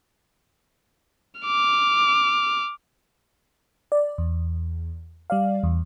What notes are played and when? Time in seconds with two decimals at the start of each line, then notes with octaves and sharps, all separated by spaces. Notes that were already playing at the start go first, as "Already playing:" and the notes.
1.41 D6 F6
3.92 D5
4.18 E2
5.30 G3 D5 F5
5.63 E2